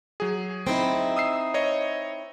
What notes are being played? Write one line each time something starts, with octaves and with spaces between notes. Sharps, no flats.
F#3 G#4
C4 D#4 E4
D#6 E6 C7
C#5 D#5